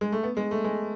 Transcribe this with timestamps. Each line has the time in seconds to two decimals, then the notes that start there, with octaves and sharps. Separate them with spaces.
0.01 G#3
0.12 A3
0.23 B3
0.37 G#3
0.51 A3
0.64 G#3